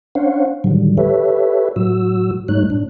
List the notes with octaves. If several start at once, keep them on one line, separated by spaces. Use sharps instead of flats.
C#4 D4 C5 C#5 F5 F#5
A2 D3 D#3 F#3 G3
G4 A4 B4 C#5 E5
A2 F#3 F#4 E6
G#2 G3 A3 D#4 C#5 F#6
A2 D4